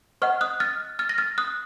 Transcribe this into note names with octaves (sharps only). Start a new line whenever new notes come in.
C5 D#5 F#5 C#6 F6
D#6 F#6
F6 A6
F6 A6
A#6
F6 A6
D#6 F#6